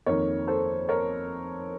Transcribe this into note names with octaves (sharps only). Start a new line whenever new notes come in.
F2 D#3 A#3 A#4 C#5
A4 C5
A#4 C#5